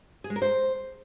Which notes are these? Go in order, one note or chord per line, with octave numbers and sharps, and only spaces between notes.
G#4
G#3
A#4
C5